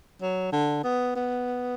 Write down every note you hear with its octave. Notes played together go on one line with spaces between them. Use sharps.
F#3
D3
B3
B3